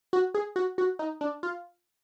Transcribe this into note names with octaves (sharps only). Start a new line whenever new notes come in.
F#4
G#4
F#4
F#4
D#4
D4
F4